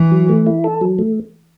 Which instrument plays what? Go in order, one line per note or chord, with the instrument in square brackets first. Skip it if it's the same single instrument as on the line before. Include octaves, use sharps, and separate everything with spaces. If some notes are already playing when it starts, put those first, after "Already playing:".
Already playing: [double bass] E3
[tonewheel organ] F#3
A3
E4
A4
F#3
A3